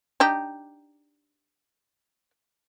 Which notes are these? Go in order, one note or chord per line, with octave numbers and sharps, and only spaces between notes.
D4 D#4 G4